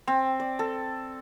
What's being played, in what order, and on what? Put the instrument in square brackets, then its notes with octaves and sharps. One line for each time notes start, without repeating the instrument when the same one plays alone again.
[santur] C4
D5
A4